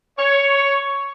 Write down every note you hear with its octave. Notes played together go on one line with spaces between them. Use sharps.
C#5